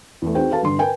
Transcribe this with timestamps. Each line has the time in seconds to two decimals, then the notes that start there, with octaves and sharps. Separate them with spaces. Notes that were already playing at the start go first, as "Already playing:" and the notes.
0.22 E2 A3
0.35 C4 D#4 F#4 G#4 C5 G5
0.50 F#4 A4 B4 F5 A5
0.63 G2 D3 C6
0.79 A#4 B4 G5 G#5